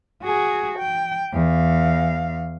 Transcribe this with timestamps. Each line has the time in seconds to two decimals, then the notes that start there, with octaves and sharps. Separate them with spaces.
0.23 F#4 G#4
0.79 G5
1.33 E2 F5